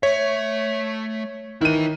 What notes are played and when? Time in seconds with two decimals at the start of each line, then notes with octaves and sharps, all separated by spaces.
0.03 A3 C#5 E5
1.61 D#3 E4 B4 D#7